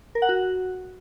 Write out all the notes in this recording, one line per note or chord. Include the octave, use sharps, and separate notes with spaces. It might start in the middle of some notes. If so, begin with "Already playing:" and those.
A#4
F#5
F#4